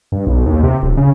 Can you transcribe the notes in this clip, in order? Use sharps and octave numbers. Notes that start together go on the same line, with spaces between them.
G2
B1
D#2
C3
D1
C#3